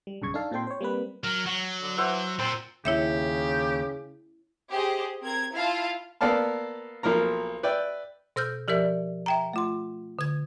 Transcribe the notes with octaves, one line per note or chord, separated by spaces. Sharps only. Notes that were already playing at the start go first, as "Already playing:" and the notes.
G3
B1 G2 C#3 C#6 G#6
D4 D#4 A4 F5 A5
A#2 C4 A4 G5 C6
C5 C#5
G3 A#3 C4 B4
F#3 A#4
F#3 F#4
D3
E3 C5 E5 F#5
A#2 C4 C6
D#2 C#3 E4 G4 C#5 E5
G4 G#4 C5 D#5
C4 A#4 G#6
E4 F4 F5 A5
A#3 B3 A4 D5 F5 A5
B1 F3 A#3 A#4 A#5
B4 D5 E5 G5
B2 C5 E6 F6 G6
F3 G4 A#4 D5 E5
E5 G5 A#5
A3 F4 C6
D3 G#6